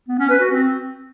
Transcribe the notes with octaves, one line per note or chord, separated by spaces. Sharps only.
B3
C#4
B4
F#4
C4